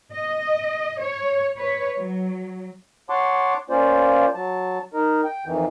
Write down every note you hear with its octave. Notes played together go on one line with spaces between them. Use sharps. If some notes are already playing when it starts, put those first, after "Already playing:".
D#5
C#5
B4 C#5
F#3
C#5 F#5 A5 C6 D6
A#3 C#4 F4 C5 D5
F#3 A5
D#4 A#4
G5
F2 D#3 E3